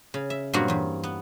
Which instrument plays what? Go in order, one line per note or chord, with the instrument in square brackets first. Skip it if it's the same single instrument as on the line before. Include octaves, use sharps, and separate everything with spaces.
[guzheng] C#3
E5
G2 A#2 F#3 A#3 C4 F#4
E2 G2
B3